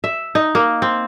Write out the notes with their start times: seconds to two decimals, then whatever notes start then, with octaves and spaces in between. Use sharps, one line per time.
0.04 E5
0.35 D#4
0.55 A#3
0.82 C4